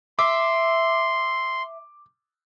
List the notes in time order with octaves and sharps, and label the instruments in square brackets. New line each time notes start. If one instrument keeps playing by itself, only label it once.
[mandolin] E5 [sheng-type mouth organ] C6 [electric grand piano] D6